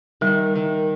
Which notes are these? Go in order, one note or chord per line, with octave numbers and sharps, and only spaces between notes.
D#3 G3
D#3